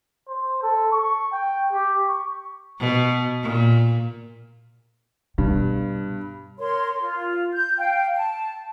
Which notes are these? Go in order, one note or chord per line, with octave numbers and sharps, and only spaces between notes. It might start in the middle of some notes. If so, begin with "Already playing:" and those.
C5
A4
C#6
G5
G4
C#6
B2
A#2
G2 B2
A#4 C#5 C6
F4
G6
F5 G5
A5